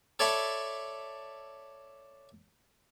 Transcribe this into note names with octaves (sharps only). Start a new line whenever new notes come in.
A4 C#5 D5 E5 A5 B5